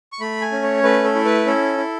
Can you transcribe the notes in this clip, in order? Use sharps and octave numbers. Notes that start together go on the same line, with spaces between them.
C#6
A3 B5
G#5
C#4
C#5
A3 B4
A4
E4
B4
C#4 A4
E4